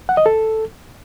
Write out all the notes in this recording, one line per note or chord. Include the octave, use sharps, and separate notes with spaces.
F#5
D#5
A4